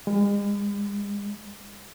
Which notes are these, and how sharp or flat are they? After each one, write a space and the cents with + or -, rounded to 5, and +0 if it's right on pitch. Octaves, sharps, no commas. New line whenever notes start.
G#3 -40